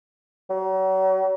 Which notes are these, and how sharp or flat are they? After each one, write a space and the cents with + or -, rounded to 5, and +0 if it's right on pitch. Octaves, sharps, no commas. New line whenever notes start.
F#3 +40